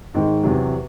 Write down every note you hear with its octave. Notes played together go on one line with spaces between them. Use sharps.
G#2 D#3 G#3
E2 C3 F#3